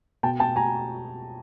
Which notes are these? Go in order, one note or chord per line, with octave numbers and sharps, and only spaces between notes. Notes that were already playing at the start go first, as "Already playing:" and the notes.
B2 G5 A5
G5 A5
G#5 A#5